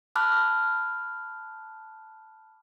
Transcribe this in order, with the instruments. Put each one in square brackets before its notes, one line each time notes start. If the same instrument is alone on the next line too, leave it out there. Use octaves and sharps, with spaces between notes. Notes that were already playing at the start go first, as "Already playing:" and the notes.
[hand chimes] A5 B5 D6 F6 F#6